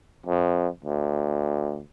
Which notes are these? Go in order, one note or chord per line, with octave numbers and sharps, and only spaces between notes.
F2
D2